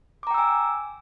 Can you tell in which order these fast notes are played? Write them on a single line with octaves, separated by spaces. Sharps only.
D6 A#5 G5 E6 G#5